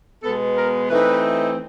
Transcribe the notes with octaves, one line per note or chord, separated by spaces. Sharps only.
B2 G#3 B3 A4
A#4
E3 A3 C4 D#4 B4